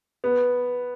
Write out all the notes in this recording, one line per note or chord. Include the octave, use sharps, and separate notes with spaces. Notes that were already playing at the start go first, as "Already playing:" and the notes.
B3